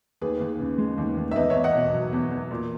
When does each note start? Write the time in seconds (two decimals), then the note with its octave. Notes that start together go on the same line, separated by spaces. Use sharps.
0.21 D#2 G#4 B4
0.40 D#2
0.60 C#3
0.78 G#3
0.98 D#2
1.17 D#2
1.31 E5
1.36 E2 B4 D#5
1.50 C#5 E5
1.55 E2
1.64 D#5 F#5
1.75 B2
1.93 F#3
2.13 E2
2.31 E2
2.51 A#2